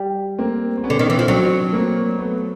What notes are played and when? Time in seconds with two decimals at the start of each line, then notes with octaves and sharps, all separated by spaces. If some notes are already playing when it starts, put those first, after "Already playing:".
Already playing: G3
0.38 A#3 C4
0.77 C4
0.84 B3 C#4
0.90 D3
0.99 D#3
1.10 E3
1.19 F3
1.28 F#3 C4 D4
1.73 A#3 C4
2.19 A3 B3